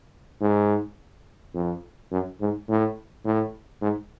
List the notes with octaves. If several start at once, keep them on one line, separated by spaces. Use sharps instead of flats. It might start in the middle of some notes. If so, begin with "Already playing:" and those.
G#2
F2
F#2
G#2
A2
A2
G#2